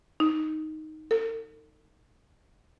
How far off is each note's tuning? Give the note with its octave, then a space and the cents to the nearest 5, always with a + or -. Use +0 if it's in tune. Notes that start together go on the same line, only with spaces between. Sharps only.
D#4 +5
A4 +45